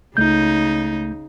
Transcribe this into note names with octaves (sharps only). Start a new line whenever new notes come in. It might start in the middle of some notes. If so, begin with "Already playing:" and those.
C#2 C#3 A3 D#4 G6